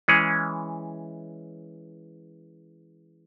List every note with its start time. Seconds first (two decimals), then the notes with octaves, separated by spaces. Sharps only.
0.08 E3 G#3 C#4 G#4